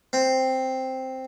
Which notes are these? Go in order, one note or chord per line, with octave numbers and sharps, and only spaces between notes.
C4